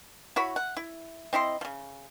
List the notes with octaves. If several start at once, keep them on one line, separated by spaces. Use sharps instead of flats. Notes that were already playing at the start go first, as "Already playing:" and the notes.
E4 F#4 C#5 B5
F#5
E4
C4 E4 D#5 C6
C#3 F3